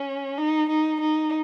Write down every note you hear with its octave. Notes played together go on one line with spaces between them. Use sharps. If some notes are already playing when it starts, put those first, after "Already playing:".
Already playing: C#4
D#4
D#4
D#4